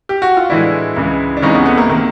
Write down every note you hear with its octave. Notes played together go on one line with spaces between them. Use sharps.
G4
F#4
F4
A2 E3 G#3 D4 E4
C#2 C#3 E3 G#3
D4
C#2 C3 E3 G#3 C#4 D#4
B3 C#4
A3 B3
A#3
C3 D#3 A#3